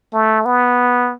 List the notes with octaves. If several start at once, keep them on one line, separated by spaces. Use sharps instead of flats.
A3
B3